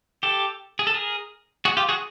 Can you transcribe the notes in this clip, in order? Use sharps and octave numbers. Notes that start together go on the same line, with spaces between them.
G4 A4
G#4
A4
G#4 A#4
F#4 G#4
F4 G4
F#4 G#4